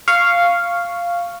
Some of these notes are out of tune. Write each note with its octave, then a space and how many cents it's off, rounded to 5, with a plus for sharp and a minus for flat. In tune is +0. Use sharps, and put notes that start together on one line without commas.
F5 -5 C#6 +0